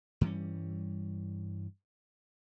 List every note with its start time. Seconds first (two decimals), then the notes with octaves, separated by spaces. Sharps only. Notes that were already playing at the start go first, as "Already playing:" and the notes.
0.21 G2 E3 G3 C#4